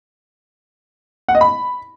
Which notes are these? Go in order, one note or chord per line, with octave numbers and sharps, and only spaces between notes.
F#5
D#5
B5